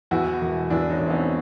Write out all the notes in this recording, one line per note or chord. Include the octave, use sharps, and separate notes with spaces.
E2 E4 F#4
E1
E2 D4 E4
C#4 D#4
E1
C4
B3 C#4